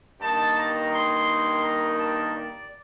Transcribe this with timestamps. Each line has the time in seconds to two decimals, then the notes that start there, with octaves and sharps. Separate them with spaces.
0.21 G2 D#3 A#3 D#4 A5
0.56 A#5
0.92 C6
1.63 A#5
1.98 A5
2.33 D5